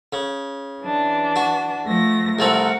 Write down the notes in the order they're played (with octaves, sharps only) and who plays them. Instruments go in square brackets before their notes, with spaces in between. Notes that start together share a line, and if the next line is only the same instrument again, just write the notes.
[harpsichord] C#3
[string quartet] E3 D4
[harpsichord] F#4
[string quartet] F3 A3 A#6
[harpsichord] C2 A3 C4 [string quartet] A#4 F#5